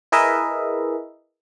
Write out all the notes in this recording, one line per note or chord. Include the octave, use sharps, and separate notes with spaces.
E4 G#4 A#4 B4 D#5 E5